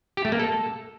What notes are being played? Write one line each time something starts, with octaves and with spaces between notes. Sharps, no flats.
G4
A3
A#3
A4